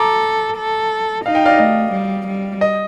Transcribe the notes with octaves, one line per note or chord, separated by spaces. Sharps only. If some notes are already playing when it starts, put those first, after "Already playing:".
Already playing: A4 A#5 D6
A4
D#4 F5
G5
D5 F5
A3 D#5
G3
G3
D#5